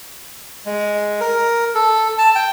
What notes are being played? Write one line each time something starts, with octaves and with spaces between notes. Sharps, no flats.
G#3
A#4
A4
A5
G5